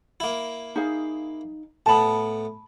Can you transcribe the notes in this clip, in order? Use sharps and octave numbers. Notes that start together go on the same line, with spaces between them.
A#3 E4
D#4 G#4 F5
A2 B3 A5 B5